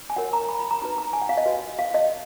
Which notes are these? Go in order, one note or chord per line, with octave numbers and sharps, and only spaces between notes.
G#5
F#4 A#4 C#5 F#5
A#5
B5
B5
A#5
D#4 F#4 B4 A#5
A#5
G#5
F#5
F5
D#5
F#4 B4
F5
D#5